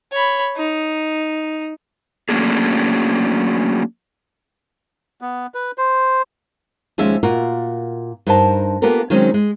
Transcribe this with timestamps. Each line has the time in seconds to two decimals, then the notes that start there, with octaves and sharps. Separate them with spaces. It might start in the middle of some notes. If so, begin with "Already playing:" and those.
0.12 C#5 B5
0.57 D#4
2.29 F#3 A3 A#3 C#4 D4 G#4
5.21 B3
5.54 B4
5.78 C5
6.98 D#2 F3 G#3 C#4 E5
7.23 A#2 F4 F#4 A#4
8.27 G2 D#4 A#4 C5 G5 A5
8.82 A#3 B3 F4 G4 A4 A#4
9.10 D#3 F#3 G#3 C4 C#4 D#4
9.34 G#3